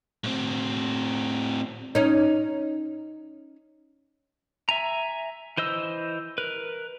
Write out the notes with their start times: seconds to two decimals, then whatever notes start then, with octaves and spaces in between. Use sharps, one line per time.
0.24 A2 C4
1.95 C#4 D#4
4.69 E5 G#5 A#5
5.57 E3 C5 D#5 E6
6.38 A#4 B4